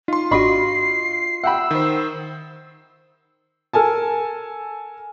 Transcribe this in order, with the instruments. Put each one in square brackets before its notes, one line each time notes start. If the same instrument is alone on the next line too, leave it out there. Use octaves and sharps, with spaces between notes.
[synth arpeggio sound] D#4 [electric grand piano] F4 C6
[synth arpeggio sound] G#1 D4 F#4 [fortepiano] D#5 B5 C#6 [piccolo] C7
[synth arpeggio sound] E5 [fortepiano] F#5 G5 B5 [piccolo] E6
[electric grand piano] D#3 C5
[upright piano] A4 A#4 G#5 A5